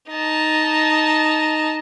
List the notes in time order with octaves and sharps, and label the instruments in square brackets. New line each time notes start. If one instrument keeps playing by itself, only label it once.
[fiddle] D#4 A5